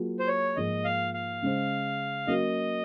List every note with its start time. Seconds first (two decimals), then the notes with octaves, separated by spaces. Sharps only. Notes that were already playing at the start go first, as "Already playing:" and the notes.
Already playing: F#3 A#3 F4 G#4
0.19 C5
0.28 C#5
0.56 G#2 F3 A#3 F4 G#4 D#5
0.85 F5
1.14 F5
1.42 C#3 G#3 C#4 G#4 C5
2.27 F#3 A#3 C#4 F#4 A#4 D#5